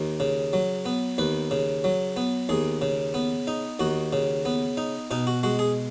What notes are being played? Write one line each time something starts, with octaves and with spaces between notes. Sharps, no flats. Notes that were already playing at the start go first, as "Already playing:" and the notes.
Already playing: D#2
C#3
F#3
B3
D#2 B4
C#3
F#3
B3
D#2 G#4
C#3
B3
D#4
D#2 F#4
C#3
B3
D#4
B2 D#4
F#4
G#3 F#4
G#4